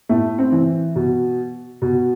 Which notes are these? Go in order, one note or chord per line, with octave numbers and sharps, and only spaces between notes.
A2 A3
C4
E3
B2
B2